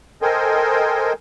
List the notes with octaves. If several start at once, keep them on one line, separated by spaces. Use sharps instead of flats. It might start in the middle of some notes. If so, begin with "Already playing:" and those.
A4 A#4 C5 D#5 G5 G#5